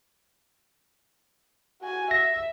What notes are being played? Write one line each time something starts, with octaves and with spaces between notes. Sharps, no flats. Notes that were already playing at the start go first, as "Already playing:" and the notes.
F#4 G#5
E5 A#6